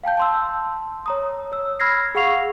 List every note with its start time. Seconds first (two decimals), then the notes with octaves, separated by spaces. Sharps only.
0.04 F5 G5 A5 G6
0.17 A5 C6 E6
1.06 C#5 A#5 D#6
1.52 C#5 E6
1.80 B5 E6 F6 G#6 A#6 C7
2.15 G#4 F5 F#5 C#6 C7 F7